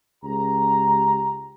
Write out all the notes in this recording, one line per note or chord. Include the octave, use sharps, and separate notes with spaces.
C#2 G4 A#5